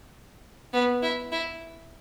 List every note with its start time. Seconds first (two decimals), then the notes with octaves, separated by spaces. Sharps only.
0.73 B3
1.02 E4
1.32 E4